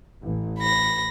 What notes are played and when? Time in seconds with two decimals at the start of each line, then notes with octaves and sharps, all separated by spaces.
0.22 A1
0.59 B5 A#6